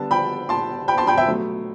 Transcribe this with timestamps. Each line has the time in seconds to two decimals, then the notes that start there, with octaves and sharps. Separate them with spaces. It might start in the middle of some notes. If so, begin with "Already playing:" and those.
Already playing: D3 G3 B3 A5
0.11 G5 B5
0.49 A5 C6
0.88 G5 B5
0.98 A5 C6
1.07 G5 B5
1.17 E5 G5
1.27 B2 F#3 A3